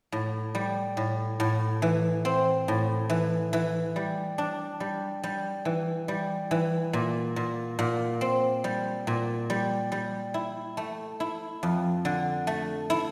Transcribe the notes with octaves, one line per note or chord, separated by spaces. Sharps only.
A2
G3
A2
A2
E3
C4
A2
E3
E3
G3
D4
G3
G3
E3
G3
E3
A#2
A#2
A#2
C4
G3
A#2
G3
G3
E4
A3
E4
F2
D3
A3
E4